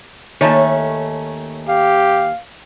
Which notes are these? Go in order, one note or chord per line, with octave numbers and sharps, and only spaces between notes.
D#2 D#3 A3 C#4 A5
G4 F5